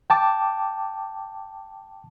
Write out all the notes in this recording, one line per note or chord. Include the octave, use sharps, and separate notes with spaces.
G5 A5 D6